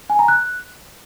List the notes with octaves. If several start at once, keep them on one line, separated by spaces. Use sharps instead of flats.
G#5
A#5
F#6